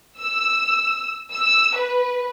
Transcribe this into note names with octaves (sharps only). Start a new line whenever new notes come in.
E6
E6
B4